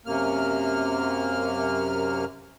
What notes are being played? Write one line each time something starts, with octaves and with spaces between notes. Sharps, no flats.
F#2 C3 A#3 F6